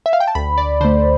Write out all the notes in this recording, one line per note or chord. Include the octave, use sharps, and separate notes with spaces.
E5
F5
G5
A5
D2 B5
D5
D3 A3 C5